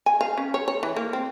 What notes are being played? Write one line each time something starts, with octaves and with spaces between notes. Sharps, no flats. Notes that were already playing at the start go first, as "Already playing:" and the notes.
G#5
F5
C#4
C#5
C#5
E3
A#3
C4